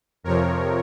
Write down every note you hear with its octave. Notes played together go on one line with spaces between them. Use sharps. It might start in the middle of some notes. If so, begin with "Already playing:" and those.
F2 C3 F3 A#4 C#5